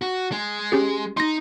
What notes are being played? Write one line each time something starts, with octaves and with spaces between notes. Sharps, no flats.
F#4
G#3
C#4 G4 G#4
D#4 C6 A#6